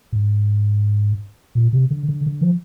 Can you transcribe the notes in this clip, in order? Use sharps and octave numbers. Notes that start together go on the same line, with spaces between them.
G#2
A#2
C3
D3
D3
D3
F3